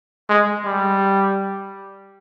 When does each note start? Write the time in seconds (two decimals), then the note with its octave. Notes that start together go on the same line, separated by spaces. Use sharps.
0.29 G#3
0.65 G3